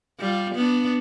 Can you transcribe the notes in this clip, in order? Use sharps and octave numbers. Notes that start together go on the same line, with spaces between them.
G3 F4
B3 D4